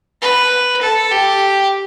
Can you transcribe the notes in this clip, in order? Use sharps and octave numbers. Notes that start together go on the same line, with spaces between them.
B4
A4
G4